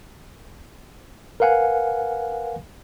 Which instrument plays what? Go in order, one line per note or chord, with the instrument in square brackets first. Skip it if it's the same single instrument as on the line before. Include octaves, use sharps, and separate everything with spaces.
[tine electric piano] A#4 B4 F5 F#5 G#5